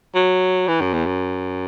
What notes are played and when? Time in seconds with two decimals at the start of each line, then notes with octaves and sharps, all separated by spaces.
0.15 F#3
0.68 E3
0.81 F#2
0.93 E2
1.06 F#2